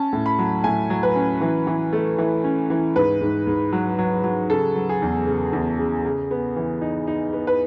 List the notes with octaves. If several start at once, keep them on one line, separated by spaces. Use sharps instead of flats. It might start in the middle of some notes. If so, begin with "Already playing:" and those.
Already playing: C#4 A5
A2
B5
F#3
A2 G#5
F#3
B4
C#4
E3
E3
A3
E3
C#4
E3
G#2 B4
G#2
G#2
F#3
F#3
F#3
C#3 A4
F#3
G#4
E2
C#3
E2
C#3
C#3
B3
E3
D#4
D#4
B3
B4